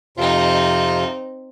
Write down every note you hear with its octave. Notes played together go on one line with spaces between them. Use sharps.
F2 C3 C4 D#4 F4